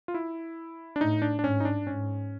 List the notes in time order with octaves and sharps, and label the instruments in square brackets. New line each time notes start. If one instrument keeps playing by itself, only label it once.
[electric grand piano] F4
E4
D4
[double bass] A2 [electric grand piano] D#4
[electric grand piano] D4
D4
[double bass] G#2 [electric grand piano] C#4
[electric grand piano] D#4
D4
[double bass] G#2 [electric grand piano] C#4